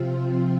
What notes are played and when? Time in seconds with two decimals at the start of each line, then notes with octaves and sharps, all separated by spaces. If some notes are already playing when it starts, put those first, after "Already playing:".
Already playing: C3 F3 C4 F4